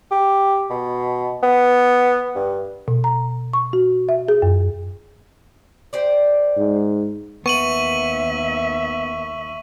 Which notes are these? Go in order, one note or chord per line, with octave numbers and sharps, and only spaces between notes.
G4
B2
B3
G2
B2
A#5
C#6
F#4
E5
G#4
F#2
G4 C5 D5
G#2
D#2 B3 E5 C#6 D#7 F#7